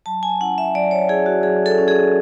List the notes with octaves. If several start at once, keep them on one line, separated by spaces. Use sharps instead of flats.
F#3 A5
G#5
C#4 E4 F#5
E5
F#3 D5
C#5
C#4 E4 G#4
F#4
F#3 G#4
A4
C#4 E4
G#4